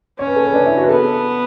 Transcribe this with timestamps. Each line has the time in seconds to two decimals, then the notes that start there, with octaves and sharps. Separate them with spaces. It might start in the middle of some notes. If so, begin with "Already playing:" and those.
0.19 C#4 C#5
0.27 B4
0.36 A4
0.45 B4
0.54 D4
0.66 E4
0.77 F#4
0.84 B4
0.89 B3 A4